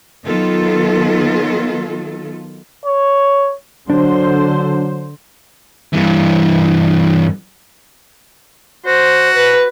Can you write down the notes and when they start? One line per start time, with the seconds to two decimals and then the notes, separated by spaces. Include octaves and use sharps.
0.25 D#3 F#3 B3 F4 A4
2.85 C#5
3.90 D3 F#3 D4 C5
5.93 G2 E3
8.86 F#4 C5
9.34 B4